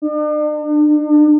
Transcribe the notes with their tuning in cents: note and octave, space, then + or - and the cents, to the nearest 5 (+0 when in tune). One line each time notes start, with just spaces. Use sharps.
D4 +45